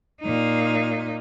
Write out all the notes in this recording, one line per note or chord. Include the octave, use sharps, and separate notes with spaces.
A#2 D#4